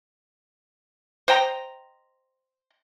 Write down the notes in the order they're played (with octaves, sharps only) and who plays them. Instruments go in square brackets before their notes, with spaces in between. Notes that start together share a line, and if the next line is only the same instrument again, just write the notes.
[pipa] C5 D#5 G5 A#5